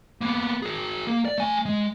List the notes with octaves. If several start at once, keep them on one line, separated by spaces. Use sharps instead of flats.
A#3 B3
G#4 A#4
A#3
D5
A3 G#5
G#3